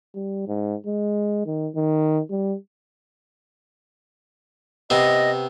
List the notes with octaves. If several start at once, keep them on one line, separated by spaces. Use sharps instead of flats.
G3
G#2
G#3
D#3
D#3
G3
C3 B3 D#5